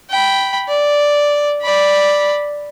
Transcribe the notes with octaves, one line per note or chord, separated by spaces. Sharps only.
G5 B5
D5
D5 B5